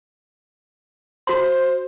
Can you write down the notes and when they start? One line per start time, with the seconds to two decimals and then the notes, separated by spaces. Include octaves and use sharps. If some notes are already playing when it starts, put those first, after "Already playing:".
1.27 F#4 C5 C6